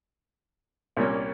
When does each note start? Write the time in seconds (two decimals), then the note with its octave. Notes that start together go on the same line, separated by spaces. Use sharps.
0.97 C2 A#2 G3 A#3 C#4